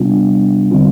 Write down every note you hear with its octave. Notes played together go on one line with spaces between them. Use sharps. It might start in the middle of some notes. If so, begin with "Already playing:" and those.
Already playing: C3 G3 B3 D4 F4
D3 G3 C4 F4